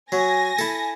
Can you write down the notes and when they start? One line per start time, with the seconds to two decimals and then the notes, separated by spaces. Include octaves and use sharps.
0.12 F#3 G#5 A#6
0.59 E4 A4